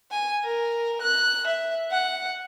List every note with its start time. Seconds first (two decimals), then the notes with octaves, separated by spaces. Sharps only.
0.11 G#5
0.44 A#4
1.01 F#6
1.47 E5
1.91 F#5